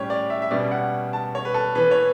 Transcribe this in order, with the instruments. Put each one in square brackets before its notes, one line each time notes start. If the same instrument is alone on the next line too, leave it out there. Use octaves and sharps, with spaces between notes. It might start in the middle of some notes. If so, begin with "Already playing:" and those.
Already playing: [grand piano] A2 G3 C#4 G4 C#5
D5
E5
E5
B2 G3 C#4 D5
F#5
A5
C#5
B4
A4
E3 B3 B4
C#5